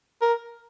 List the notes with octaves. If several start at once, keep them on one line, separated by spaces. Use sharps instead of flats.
A#4